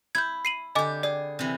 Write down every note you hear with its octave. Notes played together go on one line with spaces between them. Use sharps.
E4 G6 G#6
C7 D#7 F#7
D3 G4 D#5 G#5 D6
G#4 D5
C3 E3